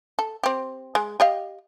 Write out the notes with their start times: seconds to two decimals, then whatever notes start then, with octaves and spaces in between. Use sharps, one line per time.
0.19 A4
0.43 C4 G4
0.95 G#3
1.20 G4 D#5 F5